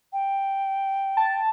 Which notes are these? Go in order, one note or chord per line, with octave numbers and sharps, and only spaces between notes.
G5
A5